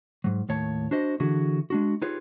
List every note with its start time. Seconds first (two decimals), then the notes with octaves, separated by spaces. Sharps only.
0.24 G#2 F#3
0.49 D#2 A2 C#5 A5
0.91 D4 F#4 C5 D#5
1.20 D3 E3 D4 F#4 G#4
1.70 G#3 D4 F#4
2.02 D#4 F4 G4 G#4 B4 C#5